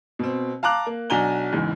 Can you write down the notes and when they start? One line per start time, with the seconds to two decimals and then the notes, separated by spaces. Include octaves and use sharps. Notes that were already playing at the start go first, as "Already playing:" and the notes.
0.19 B2 C4
0.63 F5 A5 A#5 D6 F#6
0.87 A#3
1.10 B1 D4 F#4 G#5 A#5 G7
1.52 F#1 E2 G#2